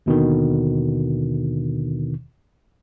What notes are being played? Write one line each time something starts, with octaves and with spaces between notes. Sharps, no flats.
D#2 B2 D3 D#3